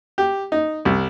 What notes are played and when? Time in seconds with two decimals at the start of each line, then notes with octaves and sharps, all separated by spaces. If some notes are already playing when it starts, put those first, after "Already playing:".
0.18 G4
0.52 D#4
0.85 C2